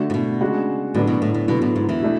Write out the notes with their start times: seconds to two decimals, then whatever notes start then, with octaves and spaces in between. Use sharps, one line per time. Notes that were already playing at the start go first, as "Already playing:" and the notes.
Already playing: D3 A3 D4 F#4
0.10 A2
0.14 B2
0.41 C#3 G#3 D4 F#4
0.94 A2 D3 F#3 B3 D4 F#4
1.07 B2
1.22 A2
1.34 A2
1.48 B2 D3 F#3 B3
1.62 A2
1.76 G#2
1.89 E2 E3
2.02 B2 A3 D4